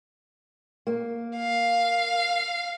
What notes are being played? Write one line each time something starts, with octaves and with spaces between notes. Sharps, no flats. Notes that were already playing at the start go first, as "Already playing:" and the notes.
A#3
F5